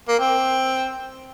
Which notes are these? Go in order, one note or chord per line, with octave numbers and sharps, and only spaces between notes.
A#3
C4